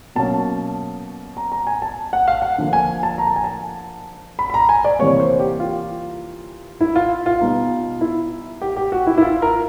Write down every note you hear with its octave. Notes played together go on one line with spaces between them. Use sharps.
B2 F#3 A#3 C#4 A5
A#5
A#5
G#5
A5
F#5
F5
F#5
D3 F3 A#3
G#5
A5
A#5
A5
G#5
A5
B5
B5
A#5
G#5
D5
C3 E3 G3 A#3 C#5
C5
G4
F4
E4
F4
F4
B2 G3 B3 D#4
E4
G4
G4
F#4
E4
E4
F4
A#4